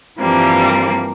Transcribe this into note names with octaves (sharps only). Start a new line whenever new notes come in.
G2 E3 F3 G3 A#3 C4